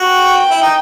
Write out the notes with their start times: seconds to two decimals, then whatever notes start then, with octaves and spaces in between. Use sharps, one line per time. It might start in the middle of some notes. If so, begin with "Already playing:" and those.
Already playing: F#4
0.08 G5
0.50 E4
0.62 D#4